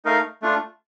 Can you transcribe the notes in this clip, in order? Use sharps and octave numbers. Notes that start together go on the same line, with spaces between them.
A3 D#4 A#4 F5
A3 D4 F4